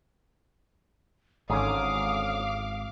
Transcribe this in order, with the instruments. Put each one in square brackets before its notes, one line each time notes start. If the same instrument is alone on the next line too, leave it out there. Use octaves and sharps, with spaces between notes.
[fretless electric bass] G#1 [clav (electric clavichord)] G#2 D3 C#4 [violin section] F5 D6 F6 [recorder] D#6